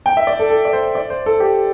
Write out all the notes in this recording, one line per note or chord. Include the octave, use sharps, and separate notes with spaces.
G5
E5
D5
A4
A4
D5
C5
D5
C5
A4
G4